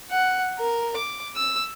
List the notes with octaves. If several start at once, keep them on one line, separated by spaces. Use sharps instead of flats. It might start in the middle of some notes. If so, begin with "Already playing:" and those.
F#5
A#4
D6
E6